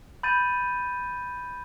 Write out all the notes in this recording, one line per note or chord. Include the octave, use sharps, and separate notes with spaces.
B5 G6 A6 D#7